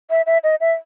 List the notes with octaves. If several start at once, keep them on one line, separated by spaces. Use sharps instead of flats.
E5
E5
D#5
E5